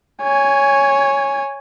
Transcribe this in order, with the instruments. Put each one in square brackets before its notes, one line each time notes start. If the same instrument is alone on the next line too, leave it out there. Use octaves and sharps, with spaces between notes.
[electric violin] C#5 G#5